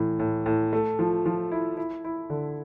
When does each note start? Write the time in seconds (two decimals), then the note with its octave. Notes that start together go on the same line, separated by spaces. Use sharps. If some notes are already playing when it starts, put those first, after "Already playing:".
Already playing: A2 E3
0.20 A2
0.46 A2
0.73 A3
0.99 F3
1.26 F3
1.52 E4
1.77 E4
2.04 E4
2.30 D3